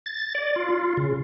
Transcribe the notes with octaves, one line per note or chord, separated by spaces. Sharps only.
A6
D5
F4
F4
C#3